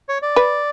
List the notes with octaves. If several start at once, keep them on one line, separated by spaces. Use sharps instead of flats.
C#5
D5
B4